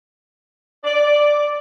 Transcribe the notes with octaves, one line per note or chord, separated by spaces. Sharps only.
D5